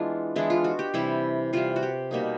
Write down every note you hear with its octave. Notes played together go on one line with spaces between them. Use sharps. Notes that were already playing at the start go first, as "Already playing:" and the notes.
Already playing: E3 G#3 B3 D4 F4
E3 G#3 B3 D4 E4
F4
F#4
G4
C3 E3 G3 E4
C3 E3 G3 F4
F#4
G4
B2 G3 A#3 D#4